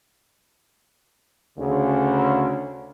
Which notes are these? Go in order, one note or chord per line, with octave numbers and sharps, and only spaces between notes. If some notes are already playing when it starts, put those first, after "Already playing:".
D2 C#3